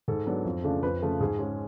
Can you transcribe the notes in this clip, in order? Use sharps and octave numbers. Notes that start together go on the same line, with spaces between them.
G#2 A4
F#3 B3 D4
F2
C#3 F3 A3 D4
F2 B4
C#3 F3 A3
G#2 G#4
G#3 C#4